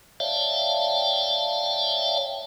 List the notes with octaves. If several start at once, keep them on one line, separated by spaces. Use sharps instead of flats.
C#5 D5 E5 F5 G5 A5